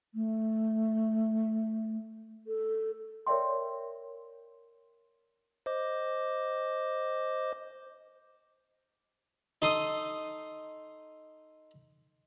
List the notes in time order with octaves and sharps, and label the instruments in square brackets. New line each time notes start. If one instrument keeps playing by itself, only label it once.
[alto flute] A3
A4
[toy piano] A#4 C#5 D5 E5 G5 C6
[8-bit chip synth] C5 D#5 D6
[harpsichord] D#4 A4 C6 D#6